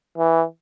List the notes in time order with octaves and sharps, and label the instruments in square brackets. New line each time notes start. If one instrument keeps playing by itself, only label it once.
[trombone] E3